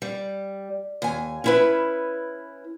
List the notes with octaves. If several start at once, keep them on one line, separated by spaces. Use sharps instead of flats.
G3
D#2 G#5
C#4 E4 B4